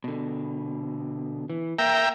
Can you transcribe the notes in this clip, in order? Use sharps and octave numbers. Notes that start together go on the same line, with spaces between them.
B2 D3
E3
A#3 E5 G5 A#5